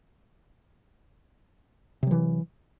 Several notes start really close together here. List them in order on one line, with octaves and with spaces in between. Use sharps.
C3 F#3 E3